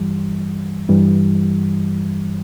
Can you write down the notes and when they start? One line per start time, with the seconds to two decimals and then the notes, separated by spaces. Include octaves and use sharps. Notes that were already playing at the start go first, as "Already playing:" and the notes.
Already playing: G2 E3 G3
0.89 G2 E3 G3